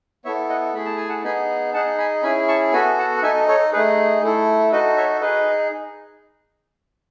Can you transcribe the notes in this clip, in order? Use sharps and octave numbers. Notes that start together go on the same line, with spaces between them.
B3 E4 A4 C#5 E5
D#5 F#5
A3 E4 G#4 B5
A5
G#5
F#5 A5
B3 D#4 G#4 G#5 B5
D#4 G#4 F#5 A5
G#5 B5
C#4 E4 G#4 G#5 B5
A5 C#6
B3 F#4 A4 G#5 B5
F#5 A5
F#5
D#4 A4 E5 G#5
A4 C#5
A3 D#4 G#4 B4
A3 E4 A4
D#4 F#4 A4 B4 D#5
C#5 E5
D#4 G#4 B4 D#5